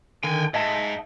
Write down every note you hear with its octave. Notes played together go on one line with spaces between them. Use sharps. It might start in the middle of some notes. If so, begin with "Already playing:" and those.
D3 D#3 G5 G#5
G#2 D#5 E5 A5